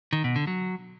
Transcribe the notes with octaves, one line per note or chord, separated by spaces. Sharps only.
D#3
B2
D3
F#3